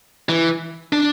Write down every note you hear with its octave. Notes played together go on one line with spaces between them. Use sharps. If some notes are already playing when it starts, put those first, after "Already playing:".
E3
D4